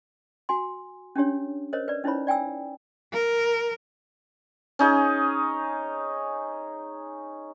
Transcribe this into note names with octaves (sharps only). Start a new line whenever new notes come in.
F#4 G#5 C6
C#4 D4 G4 C#5
A#4 C5 C#5 D#5
B4 D5
C#4 D#4 E4 C5 C#5 B5
D5 G5 G#5 E6
A#4
C#4 D#4 G#4